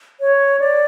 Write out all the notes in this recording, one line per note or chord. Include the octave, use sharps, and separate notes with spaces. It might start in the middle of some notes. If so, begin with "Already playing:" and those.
C#5
D5